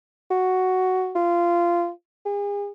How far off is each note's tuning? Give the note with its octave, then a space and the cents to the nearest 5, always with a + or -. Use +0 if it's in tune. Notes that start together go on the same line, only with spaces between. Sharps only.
F#4 +5
F4 -15
G#4 -40